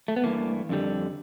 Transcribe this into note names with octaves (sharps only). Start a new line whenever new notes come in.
A3
B3
G2 E3 A3 A#3
F2 D3 G3